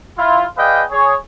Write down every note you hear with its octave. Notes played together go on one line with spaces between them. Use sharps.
E4 F4
G#4 B4 D5 D#5 F5 G5
G#4 C#5